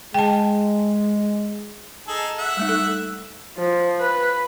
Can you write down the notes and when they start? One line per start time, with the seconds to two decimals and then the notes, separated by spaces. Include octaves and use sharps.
0.14 G#3 G5 A5
2.08 D#4 G#4 A4
2.38 E5 F#5
2.57 G3 A3 D#4
2.69 D#4 A4
3.57 F3
4.00 B4